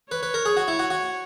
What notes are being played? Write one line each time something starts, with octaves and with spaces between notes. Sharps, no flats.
B4 C#5
B4
A#4
G#4
F#4
E4
F#4
F#4